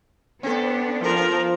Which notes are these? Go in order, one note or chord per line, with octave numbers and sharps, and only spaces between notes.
B3 C4 D4 A4
F3 A#4